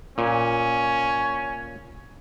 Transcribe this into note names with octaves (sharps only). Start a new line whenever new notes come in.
A#2 C#4